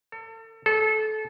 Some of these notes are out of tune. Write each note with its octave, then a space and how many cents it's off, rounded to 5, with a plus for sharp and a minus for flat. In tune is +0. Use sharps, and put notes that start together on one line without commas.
A4 +35
A4 -25